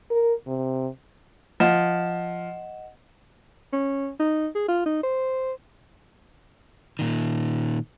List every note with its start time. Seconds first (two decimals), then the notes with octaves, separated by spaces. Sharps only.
0.10 A#4
0.47 C3
1.60 F3 D#5 F#5 E7
3.72 C#4
4.19 D#4
4.55 G#4
4.68 F4
4.86 D#4
5.03 C5
6.99 A#2 D#3